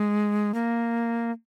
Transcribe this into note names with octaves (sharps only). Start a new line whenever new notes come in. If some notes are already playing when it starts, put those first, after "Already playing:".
Already playing: G#3
A#3